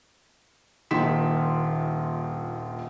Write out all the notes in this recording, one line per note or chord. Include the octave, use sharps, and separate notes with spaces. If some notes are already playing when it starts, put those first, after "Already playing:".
D#1 A#1 D#3 C6 B6 E7